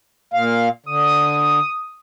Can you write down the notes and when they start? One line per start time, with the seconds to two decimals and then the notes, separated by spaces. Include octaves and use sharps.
0.34 A#2 F5
0.86 D3 D#6